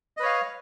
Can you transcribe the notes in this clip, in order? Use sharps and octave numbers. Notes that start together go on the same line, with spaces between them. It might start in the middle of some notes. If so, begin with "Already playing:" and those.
B4 C#5 D#5 F5